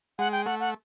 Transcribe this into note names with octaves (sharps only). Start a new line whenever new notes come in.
G#3 F#5
G5
A3 F#5
F#5